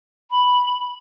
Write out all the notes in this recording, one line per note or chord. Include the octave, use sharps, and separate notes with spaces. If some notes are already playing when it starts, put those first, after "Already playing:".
B5